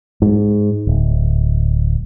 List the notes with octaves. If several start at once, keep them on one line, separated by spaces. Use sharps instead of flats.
G#2
D1